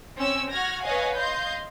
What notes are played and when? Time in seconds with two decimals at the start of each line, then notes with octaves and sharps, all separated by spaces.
0.18 C4 C#4 C#5 E6
0.52 F#4 F6 G#6 A#6
0.83 B4 C#5 D#5 F5 F#5 G#5
1.17 D#5 F5 C6 G6